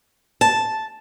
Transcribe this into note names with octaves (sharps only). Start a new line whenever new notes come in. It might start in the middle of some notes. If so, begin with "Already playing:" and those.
A5